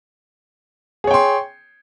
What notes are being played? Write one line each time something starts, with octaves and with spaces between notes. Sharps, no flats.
G#4 C#5 G5 C6